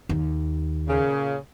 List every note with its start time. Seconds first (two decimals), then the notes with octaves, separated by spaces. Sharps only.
0.09 D#2
0.88 A#2 C#3